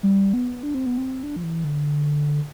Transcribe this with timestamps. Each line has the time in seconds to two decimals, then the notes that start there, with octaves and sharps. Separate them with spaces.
0.03 G3
0.33 B3
0.63 D4
0.74 C4
0.86 B3
0.98 C4
1.23 D4
1.36 F3
1.43 E3
1.64 D3